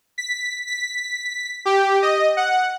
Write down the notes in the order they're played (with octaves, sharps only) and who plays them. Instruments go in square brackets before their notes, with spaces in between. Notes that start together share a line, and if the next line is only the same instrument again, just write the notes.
[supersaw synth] B6
B6
G4
D#5
F#5